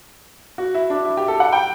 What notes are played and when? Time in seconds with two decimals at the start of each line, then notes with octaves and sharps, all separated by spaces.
0.58 F#4
0.74 E4
0.90 D4
1.05 E4
1.17 G4
1.28 A4
1.40 F#5
1.52 G5